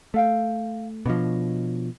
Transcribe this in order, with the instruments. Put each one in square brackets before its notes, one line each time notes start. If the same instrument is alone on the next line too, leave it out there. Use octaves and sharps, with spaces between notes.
[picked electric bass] A3 [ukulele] A4 F5 G5
[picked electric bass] B2 F3 [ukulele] D4 C#5 D#5